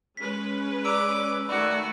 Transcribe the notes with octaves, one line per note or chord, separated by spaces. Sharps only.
G#3 C#4 B4 B6
D5 A#5 D6 E6 D7
D#3 A3 F#4 D5 B5